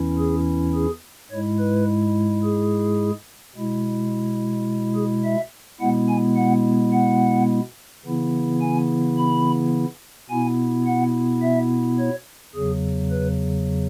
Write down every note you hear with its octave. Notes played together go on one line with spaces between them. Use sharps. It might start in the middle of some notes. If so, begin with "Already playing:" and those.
Already playing: E2 E3 C#4 E4
G#4
G#4
G#2 G#3 E4 C#5
B4
G#4
B2 G#3 E4
G#4
E5
B2 G#3 B3 E4 F#5
G#5
F#5
F#5
C#3 E3 B3 E4
G#5
B5
B2 B3 E4 G#5
F#5
E5
C#5
E2 C#3 F#3 G#4
B4